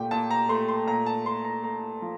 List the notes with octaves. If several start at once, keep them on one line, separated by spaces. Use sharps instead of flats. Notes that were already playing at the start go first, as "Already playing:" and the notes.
Already playing: A#2 A3 G4 G5
A#2 A5
A#5
A3 C6
C6
A#2 A#5
A5
A3 C6
A#5
A3 A#5
F3